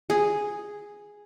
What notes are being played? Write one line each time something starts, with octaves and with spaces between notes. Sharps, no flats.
G#4